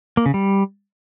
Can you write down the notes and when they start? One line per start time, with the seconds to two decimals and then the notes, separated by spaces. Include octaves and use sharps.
0.17 A#3
0.26 C#3
0.34 G3